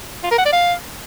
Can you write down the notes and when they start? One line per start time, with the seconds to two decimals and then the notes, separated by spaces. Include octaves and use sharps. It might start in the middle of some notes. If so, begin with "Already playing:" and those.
0.24 F4
0.31 A#4
0.38 F#5
0.46 D5
0.53 F5